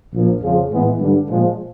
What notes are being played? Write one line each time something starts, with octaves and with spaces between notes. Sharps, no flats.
A#1 A#2 F3 A#3
F2 C#3 F3 G#3
A2 E3 G#3 B3
G2 D3 G3
A#2 F3 G#3